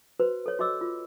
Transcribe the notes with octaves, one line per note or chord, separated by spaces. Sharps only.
F#4 B4 C5
A4 C#5
F#4 C#5 D#5 D6 E6
F4